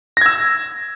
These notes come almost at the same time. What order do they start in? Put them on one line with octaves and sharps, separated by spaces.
A#6 G#6 E6